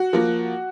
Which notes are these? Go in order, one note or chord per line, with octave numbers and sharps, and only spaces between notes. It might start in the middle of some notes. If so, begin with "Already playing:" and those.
Already playing: F#4
F3 A#3